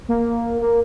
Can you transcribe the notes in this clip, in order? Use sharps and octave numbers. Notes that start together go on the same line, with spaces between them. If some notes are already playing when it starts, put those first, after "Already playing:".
A#3
A#3